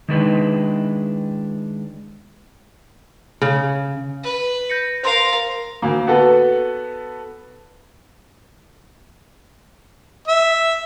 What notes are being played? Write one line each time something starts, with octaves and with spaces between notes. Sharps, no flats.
D#3 G#3 D4 E4 B4
C#3
B4
G6 A#6 C#7
A#4 C5 F5 C6
D2 A#3
B3 F#4 A4 B4
E5